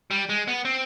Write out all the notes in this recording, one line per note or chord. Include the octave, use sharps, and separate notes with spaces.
G3
G#3
B3
C4